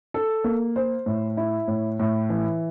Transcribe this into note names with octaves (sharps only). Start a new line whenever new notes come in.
A4
A#3
C5
A2
E4
A2
A2
E3